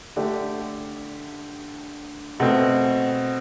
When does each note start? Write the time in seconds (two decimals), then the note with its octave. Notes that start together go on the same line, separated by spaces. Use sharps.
0.16 D3 A3 D4 G4
2.40 B2 A3 C4